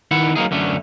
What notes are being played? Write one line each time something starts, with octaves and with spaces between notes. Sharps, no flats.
D#3 E4 F#5
F#3 A#3 D#4 G#4
F#2 D3 A3 C#4